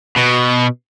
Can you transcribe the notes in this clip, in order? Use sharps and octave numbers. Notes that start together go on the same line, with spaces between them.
B2